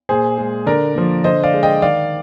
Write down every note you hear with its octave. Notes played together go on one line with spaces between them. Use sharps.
A#2 G#4 C5
G#3
D3 A#4 D5
F3 A#3
D3 C5 D#5
D5 F5
G#3
D#5 G5
D#3 D5 F5